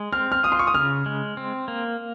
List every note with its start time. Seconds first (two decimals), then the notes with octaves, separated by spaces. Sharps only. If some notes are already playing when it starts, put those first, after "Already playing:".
Already playing: G#3
0.12 C4 F6
0.32 F6
0.43 F4 D#6
0.52 C6
0.59 C#6
0.67 D#6
0.74 C#3 F6
1.06 G#3
1.37 C4
1.68 A#3